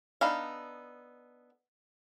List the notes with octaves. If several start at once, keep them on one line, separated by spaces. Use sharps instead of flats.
B3 D4 D#4 A4 F5